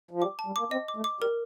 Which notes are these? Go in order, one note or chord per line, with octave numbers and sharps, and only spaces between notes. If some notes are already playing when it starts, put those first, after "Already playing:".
F3
G3 D6
A5
G3
A#3 D6
C4 D#5
D6
A3
D6
G3 A#4